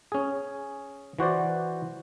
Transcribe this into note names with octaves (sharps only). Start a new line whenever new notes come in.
C#4 G#4
E3 F#4 C5 D5